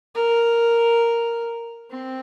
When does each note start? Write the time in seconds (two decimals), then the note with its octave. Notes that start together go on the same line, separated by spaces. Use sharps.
0.15 A#4
1.91 C4